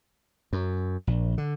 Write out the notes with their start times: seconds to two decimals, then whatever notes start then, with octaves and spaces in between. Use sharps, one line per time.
0.53 F#2
1.07 A#1
1.38 D3